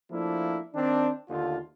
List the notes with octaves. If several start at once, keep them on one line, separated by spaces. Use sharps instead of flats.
F3 A3 A#3 D4 E4
D#3 C4 D4
D#2 D3 A3 F4